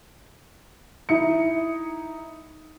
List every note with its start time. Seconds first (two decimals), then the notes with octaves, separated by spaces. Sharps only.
1.09 D#4 E4 C#7